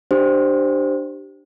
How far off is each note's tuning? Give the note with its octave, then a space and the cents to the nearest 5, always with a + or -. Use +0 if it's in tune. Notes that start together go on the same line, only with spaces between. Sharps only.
D4 +15 G4 -15 C5 +0